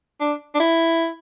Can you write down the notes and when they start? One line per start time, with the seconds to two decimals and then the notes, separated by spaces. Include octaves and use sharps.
0.20 D4
0.55 D4
0.60 E4